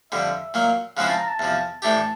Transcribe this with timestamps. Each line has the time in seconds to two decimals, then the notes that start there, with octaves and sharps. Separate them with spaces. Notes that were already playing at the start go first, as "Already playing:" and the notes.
0.12 F2 D3 G3 E5
0.54 A#2 F#3 A#3
0.97 C#3 F3 G#3 C4 E4 F#5
1.08 A5
1.18 A#5
1.29 A5
1.39 E2 C3 F3
1.82 A2 E3 A3 D4 G4 A5